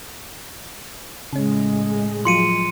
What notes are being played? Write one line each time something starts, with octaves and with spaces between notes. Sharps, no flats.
A2 C#3 G#3 C#4
F3 F#3 F4 C6 C#7 D#7